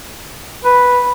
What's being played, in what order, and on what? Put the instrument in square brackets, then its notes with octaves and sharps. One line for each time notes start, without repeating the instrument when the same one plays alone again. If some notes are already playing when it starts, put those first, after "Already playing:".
[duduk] B4